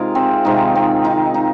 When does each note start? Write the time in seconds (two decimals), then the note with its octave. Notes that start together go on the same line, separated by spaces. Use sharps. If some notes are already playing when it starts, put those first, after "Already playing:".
Already playing: C3 G#3 D#4 F4 G#4 A#4
0.15 C4
0.45 C3 D#3 G#3 D#4
0.75 C4
1.04 D#4
1.34 D#4